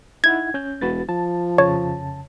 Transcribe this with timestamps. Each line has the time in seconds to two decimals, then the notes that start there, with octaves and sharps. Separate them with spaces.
0.24 D#4 E4 F#5 G#6
0.54 C#4 G6
0.81 E1 F#4 B4 A6
1.09 F3 A5
1.58 F2 C#3 C#5 A5